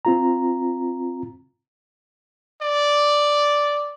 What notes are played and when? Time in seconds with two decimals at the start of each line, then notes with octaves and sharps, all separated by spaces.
0.05 C4 F4 A#5
2.62 D5